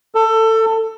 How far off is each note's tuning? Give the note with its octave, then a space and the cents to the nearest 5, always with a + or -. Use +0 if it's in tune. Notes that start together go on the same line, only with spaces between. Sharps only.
A4 +20